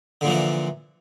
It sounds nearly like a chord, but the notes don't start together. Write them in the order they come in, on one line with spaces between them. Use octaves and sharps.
D3 A#2 F3 E3